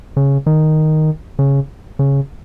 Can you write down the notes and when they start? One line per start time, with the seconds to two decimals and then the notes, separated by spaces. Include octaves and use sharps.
0.17 C#3
0.46 D#3
1.39 C#3
1.99 C#3